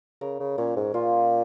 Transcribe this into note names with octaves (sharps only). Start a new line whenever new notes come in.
C#3 A#4
C#3
A#2 C#4
G#2
A#2 F4